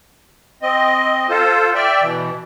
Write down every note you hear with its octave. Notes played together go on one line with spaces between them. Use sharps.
C4 D#5
F4 A4 C5
D5 E5 G5
B2 E3